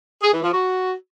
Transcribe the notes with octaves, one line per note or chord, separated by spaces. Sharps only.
G#4
E3
F3
F#4